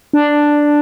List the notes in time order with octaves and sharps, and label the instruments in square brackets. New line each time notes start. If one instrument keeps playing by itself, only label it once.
[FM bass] D4